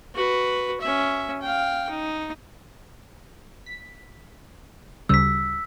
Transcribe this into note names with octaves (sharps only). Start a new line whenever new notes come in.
F#4 B4
C#4 E5
F5 G5
D#4
B6
D2 C#3 G3 E6 B6